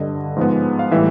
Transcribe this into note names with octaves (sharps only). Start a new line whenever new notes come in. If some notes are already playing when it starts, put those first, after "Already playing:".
Already playing: G2 D3 G3 D#5
G#2 F3 G#3 B3
F5
A2 E3 G3 E5